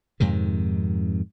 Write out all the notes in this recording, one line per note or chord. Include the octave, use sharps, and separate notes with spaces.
F2 G#2 C3 D#3